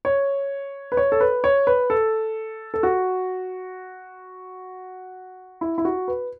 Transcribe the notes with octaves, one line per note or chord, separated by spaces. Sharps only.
C#5
B4
C#5
A4
B4
C#5
B4
A4
A4
F#4
E4
E4
F#4
B4